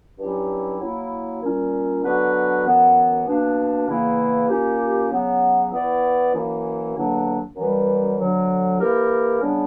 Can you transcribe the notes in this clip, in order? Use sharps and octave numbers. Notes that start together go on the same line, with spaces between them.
G2 F#3 C#4 E4 G4
F#3 A#3 E4
A#2 G3 C#4
D3 F#3 B3 F#4 B4
F#2 E3 B3
B2 A#3 D4
E2 C#3 E3 A#3 E4
A#2 A#3 C#4 G4
C#3 F#3 B3
E3 B3 E4 B4 D5
F#2 E3 A#3 E4
E2 D3 F#3 A#3 D4
F#2 E3 G3 B3
D2 D3 F#3
E3 A#3 E4 G4 A#4
C#3 G3 B3 D4